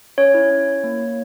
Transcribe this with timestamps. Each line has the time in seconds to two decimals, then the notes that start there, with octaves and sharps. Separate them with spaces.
0.18 C#4 C#5
0.34 E4
0.51 C#4
0.67 E4
0.84 A#3
1.00 A#3